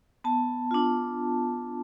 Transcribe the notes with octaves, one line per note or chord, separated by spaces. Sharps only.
B3 A5
D4 F4